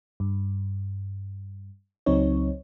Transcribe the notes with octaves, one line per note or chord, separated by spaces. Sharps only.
G2
C#2 F#3 C4 D#4 C#5